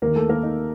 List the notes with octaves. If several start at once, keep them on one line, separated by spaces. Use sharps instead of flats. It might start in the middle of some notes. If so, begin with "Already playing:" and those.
D#2 D#3 A#3 A#4
A3 A4
A#3 A#4
D#4